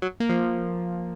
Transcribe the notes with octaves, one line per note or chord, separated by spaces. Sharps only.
F#3
A#3
F3